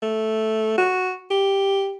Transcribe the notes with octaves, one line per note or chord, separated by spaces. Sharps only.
A3
F#4
G4